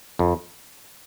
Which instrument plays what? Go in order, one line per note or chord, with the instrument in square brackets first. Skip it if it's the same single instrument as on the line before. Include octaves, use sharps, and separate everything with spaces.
[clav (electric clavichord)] F2